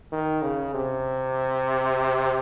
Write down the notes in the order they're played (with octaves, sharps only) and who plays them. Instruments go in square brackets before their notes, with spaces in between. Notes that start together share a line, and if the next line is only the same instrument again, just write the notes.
[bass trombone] D#3
C#3
C3